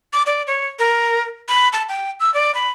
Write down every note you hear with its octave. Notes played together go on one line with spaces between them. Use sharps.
D6
D5
C#5
A#4
B5
A5
G5
E6
D5
B5